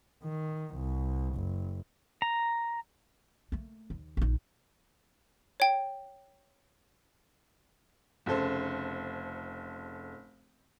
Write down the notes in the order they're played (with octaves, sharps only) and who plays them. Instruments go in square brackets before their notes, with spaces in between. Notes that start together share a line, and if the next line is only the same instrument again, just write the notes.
[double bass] D#3
C2
F#1
[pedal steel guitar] A#5
[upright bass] A3 A#3
D#2
A#1 D#4
[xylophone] C#5 G5
[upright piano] F1 C#3 A4 C5